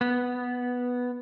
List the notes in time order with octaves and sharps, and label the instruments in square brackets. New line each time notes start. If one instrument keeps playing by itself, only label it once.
[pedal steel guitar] B3